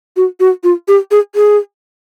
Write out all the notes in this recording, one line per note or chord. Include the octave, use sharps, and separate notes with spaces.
F#4
F#4
F4
G4
G#4
G#4